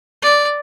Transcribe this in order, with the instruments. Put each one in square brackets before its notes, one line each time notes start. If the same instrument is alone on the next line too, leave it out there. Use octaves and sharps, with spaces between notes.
[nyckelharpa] D5